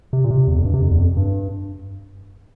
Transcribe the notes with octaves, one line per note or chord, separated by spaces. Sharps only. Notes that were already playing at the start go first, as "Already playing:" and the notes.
C3
A#2
C3
E2
F2
G2
C3
F2
E2
F2
G2